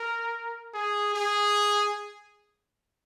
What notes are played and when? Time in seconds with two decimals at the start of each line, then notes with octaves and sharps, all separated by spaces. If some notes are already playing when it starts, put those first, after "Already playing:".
Already playing: A#4
0.74 G#4
1.14 G#4